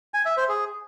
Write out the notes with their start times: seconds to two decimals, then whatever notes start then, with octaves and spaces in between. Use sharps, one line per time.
0.14 G#5
0.26 E5
0.37 C5
0.49 G#4